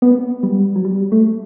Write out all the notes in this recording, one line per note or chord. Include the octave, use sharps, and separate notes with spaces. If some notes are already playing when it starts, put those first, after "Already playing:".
B3
G3
F#3
G3
A3